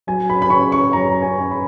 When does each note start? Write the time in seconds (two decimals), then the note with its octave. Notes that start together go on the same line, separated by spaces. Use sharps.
0.07 F#3 G#5
0.29 B5
0.42 B5
0.50 C#3 C#6
0.72 C#6
0.93 F#2 A#5
1.22 G#5
1.37 F#2
1.51 B5